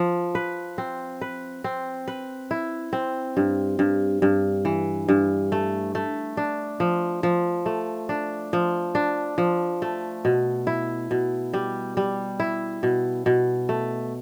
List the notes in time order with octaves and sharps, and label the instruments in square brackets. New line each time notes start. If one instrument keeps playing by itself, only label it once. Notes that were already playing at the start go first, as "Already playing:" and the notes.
Already playing: [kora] F3
B4
C4
B4
C4
B4
E4
C4
G2
G2
G2
E3
G2
A3
A3
D4
F3
F3
A3
D4
F3
D4
F3
A3
B2
E4
B2
G3
G3
E4
B2
B2
A3